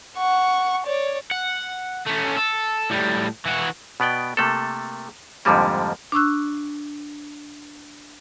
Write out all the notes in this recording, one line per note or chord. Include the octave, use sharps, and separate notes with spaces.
F#5 C#6
C#5 D5
F#5
A3 C#4
A4
A2 G3
E3 F#4
B2 B3 D5 G5
C3 A3 A#3 A4
F2 G#2 D3 F3 G3 A#3
D4 C#6 E6 F#6